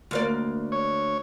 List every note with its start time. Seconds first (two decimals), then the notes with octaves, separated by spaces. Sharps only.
0.11 D2 A#3 D5
0.72 C#5